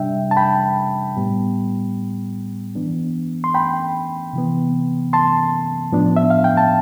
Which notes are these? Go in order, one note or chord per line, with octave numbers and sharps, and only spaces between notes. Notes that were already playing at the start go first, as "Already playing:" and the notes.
Already playing: C3 G3 D4 E5 G5
A5
G5 B5
A2 G3 B3
E3 B3 D4
C6
G5 B5
C3 E3 B3
A5 C6
A2 F3 B3 D4
E5
F5
G5
A5